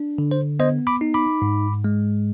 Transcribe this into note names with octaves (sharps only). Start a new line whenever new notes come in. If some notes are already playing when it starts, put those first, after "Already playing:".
Already playing: D4
D3
C5
B3 C5 D#5
B5 D6
D#4
B5 D6
G#2
G#3